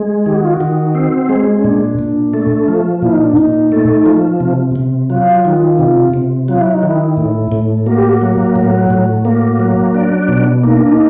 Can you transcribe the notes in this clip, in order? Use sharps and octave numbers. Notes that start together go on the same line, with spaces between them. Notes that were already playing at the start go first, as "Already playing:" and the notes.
Already playing: G#3
D#3 G4
F#4
F4
F#4
D#3
C4
G#3
C#4
A#2 D4
A#2
A3
F3
A#2 E4
D#4
D4
A#2 D#4
A3
F3
C3
C3
F#3 F4
D#3
C3
C3
F#3 F4
E4
D#4
D#3
E4
A2
A2
A#3 F#4
G4
F#4
F#3
A2
A2
A#3
F#3
D4
B2
A#3 D#4
D4
D#4